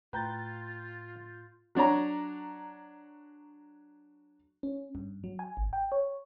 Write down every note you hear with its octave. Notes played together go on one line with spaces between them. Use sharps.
A2 F4 B4 G5 A#5 G6 A6
F#3 D4 C#5 A#5
C#4
G2
F#3
G#5
G#1
G5
C#5